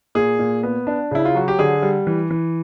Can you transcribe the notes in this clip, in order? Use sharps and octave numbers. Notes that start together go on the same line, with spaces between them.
A#2 G#4
A#2
B3
D4
C#3 E4
F4
F#3 F#4
G4
D3 G#4
G3
E3
E3